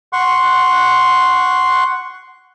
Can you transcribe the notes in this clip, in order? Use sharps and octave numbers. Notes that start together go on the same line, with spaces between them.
F#5 C6 C#6